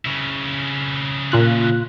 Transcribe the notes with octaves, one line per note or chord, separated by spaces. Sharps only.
C#3 E4
A#2 F4 F#6